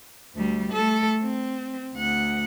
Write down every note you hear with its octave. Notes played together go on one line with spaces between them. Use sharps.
D2 G3
A3 A4
C4
D2 F#5